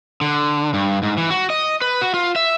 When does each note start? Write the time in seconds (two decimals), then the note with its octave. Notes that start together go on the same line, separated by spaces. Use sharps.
0.21 D3
0.74 G2
1.03 G#2
1.17 E3
1.30 F#4
1.50 D#5
1.81 B4
2.01 F#4
2.14 F4
2.36 E5